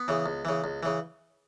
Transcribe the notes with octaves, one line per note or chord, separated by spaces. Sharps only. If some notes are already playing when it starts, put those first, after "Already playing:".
Already playing: B3
C#3 E3
C#2
C#3 E3
C#2
C#3 E3